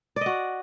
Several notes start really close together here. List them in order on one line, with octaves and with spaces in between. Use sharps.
D5 D#5 F#4